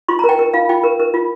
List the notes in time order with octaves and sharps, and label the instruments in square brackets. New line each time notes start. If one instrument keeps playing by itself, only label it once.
[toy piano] F4 C6
A#5
A#4
G5
A#4
F4 F5
F4 G5
A#4
A#4
F4